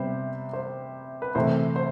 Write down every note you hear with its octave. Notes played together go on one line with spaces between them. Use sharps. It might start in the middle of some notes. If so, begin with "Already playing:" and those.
Already playing: C3 G3 B3 C5 E5
C5
B4
C3 E3 A3 C5
C5